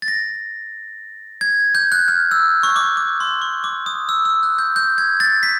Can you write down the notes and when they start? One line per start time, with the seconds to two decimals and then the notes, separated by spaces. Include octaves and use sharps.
0.02 A6
0.08 A#6
1.41 G#6
1.75 G6
1.92 F#6
2.08 F6
2.31 E6
2.63 C#6
2.76 D6
2.97 D6
3.20 C6
3.42 C#6
3.64 D6
3.86 D#6
4.09 E6
4.25 E6
4.43 F#6
4.59 G6
4.76 G6
4.98 G#6
5.20 A6
5.43 B6